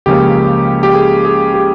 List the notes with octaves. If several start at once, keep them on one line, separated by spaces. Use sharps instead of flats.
C#2 C#3 F3 A#3 C#4 G4
G4
G#4
G#4
G4